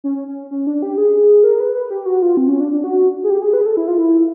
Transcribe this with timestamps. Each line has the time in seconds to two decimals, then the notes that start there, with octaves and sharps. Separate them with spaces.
0.04 C#4
0.28 C#4
0.51 C#4
0.67 D4
0.82 G4
0.98 G#4
1.44 A#4
1.60 B4
1.75 B4
1.90 G4
2.06 F#4
2.22 F4
2.37 C4
2.48 C#4
2.60 D4
2.71 D4
2.84 F#4
3.24 G#4
3.30 G4
3.42 G#4
3.53 B4
3.61 G#4
3.66 A4
3.77 E4
3.88 F4
3.98 E4